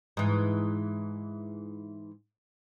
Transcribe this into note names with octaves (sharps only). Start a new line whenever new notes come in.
G#2 E3